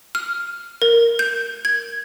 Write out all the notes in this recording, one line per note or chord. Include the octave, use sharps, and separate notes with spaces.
F6
A#4
G6
G#6